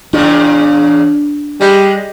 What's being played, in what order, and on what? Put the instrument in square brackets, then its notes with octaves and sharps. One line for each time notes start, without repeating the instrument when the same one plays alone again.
[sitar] E2 A#2 C#3 [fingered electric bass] D4
[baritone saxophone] G3 [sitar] G#3